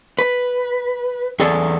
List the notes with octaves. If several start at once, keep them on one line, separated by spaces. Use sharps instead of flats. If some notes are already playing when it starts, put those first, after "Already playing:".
B4
E2 G#4 A4 D5